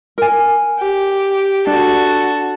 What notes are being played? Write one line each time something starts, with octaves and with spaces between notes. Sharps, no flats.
A#4 G#5
G4
D4 F#4 A4